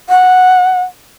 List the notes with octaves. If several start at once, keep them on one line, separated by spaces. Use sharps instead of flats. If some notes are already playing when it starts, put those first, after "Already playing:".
F#5